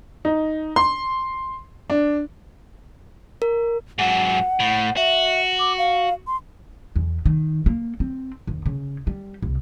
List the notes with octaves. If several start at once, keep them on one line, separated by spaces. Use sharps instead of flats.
D#4
C6
D4
A#4
G#2 F#3 F#5
A2
F#4 E5
D6
F5
C6
E2
D#3
A#3
C4
D#2
C#3
G3
C2